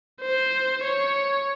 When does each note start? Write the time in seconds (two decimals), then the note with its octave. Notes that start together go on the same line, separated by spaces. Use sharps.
0.22 C5
0.85 C#5